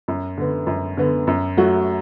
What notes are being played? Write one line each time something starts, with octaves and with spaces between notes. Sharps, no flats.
F#2
D3 B3
F#2
D3 B3
F#2
F#3 A3 F#4